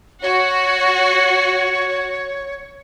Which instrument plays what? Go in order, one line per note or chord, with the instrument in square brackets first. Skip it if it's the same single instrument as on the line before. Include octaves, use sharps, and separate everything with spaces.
[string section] F#4 [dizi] C#5